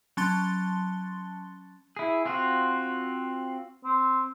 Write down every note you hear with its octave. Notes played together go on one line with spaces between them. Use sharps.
F#3 C#4 A5 C6 A6 G7
E4 G#4
C4 F4 F#4
C4